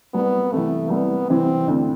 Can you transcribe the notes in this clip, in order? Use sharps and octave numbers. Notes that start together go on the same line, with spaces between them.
C2 B3
C3 E3 A3
C2 B3
C3 E3 C4
D2